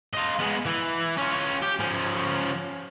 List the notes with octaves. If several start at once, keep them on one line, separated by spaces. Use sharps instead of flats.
F4 D#5
G#3 B3
E3
C#4 F4
G4
F3 C#4